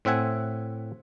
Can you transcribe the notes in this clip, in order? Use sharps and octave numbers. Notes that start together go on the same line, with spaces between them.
A2 C4 E5 F#5 G#5